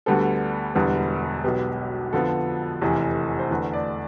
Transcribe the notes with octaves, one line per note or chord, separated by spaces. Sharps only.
D2 D3 G3 B3 A4
E1 E2 D3 G3 B3
B1 B2 B3 G4
F2 D3 F3 B3 A4
F1 E2 C3 E3
C5
E2 D3 A3 B4
D5